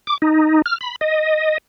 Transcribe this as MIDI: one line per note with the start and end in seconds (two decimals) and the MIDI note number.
0.07 0.18 86
0.22 0.62 63
0.66 0.78 89
0.81 0.96 83
1.01 1.58 75